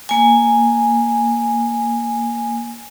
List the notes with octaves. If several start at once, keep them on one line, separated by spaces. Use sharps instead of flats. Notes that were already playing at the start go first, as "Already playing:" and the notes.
A#3 G#5